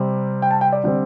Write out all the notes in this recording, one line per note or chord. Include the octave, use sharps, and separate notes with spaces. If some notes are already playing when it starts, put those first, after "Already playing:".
Already playing: C3 G3 C4
G5
A5
G5
D5
D3 G3 C4